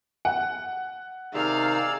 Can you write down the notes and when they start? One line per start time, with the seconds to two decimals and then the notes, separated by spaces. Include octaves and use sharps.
0.25 F#5
1.34 C3 D#3 D#4 G#4 D5 F5 E6